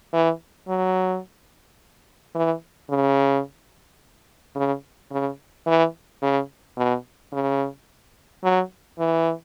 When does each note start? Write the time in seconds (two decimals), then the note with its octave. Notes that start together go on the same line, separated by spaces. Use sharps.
0.13 E3
0.68 F#3
2.35 E3
2.90 C#3
4.55 C#3
5.11 C#3
5.67 E3
6.22 C#3
6.77 B2
7.33 C#3
8.44 F#3
8.99 E3